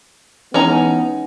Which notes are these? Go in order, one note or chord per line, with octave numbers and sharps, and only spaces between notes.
E3 G#3 B3 C#4 D#4 A#5